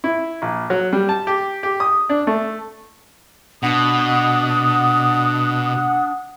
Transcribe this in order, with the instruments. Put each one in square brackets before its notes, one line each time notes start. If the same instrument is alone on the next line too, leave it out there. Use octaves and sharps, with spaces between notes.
[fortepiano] E4
A#1
F#3
G3
A5
G4
G4
D#6
D4
A3
[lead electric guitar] B2 [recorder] D4 [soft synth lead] F#5 [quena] D#6